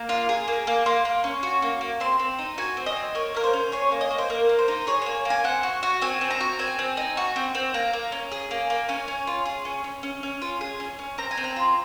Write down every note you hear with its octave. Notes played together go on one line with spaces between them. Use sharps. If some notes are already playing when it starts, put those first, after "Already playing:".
Already playing: A#3 A#5
F4
G#4
A#3
A#3
A#3 C6
A#3
C#4
F#4
A#3
A#3
C4 C6
C4
D#4
F#4 G#5
C4
D#5
C4
A#3 C#5
A#3 A#4
C5
C#4
G#4 C#5
A#3
D#5
A#3
C5
A#3 A#4
A#3
C5
D#4
G#4 C#5
A#3 C#5
A#3 G#5
C4 F#5
F#4
F#4
C4 G#5
C4
A#5
F#4
C4 G#5
C4
D#4
F#4
C4
C4
A#3 A#5
A#3
C#4
G#4
A#3
A#3
C#4 G#5
C#4
F4
G#4
C#4
C#4
C#4
C#4
F4
G#4
C#4
C#4
C4 A#5
G#5
C4
A#5
F4